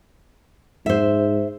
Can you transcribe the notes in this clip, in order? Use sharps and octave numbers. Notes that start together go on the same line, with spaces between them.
G#2 C5 E5